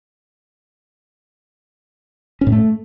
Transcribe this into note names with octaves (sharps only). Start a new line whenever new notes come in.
C#4
A2
A3